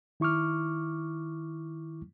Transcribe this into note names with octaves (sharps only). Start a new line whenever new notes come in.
D#3 E4 C#6 D6 F6